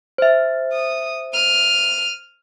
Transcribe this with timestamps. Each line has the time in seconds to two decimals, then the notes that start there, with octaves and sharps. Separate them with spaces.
0.18 C5 E5
0.73 D#6
1.33 F6 D#7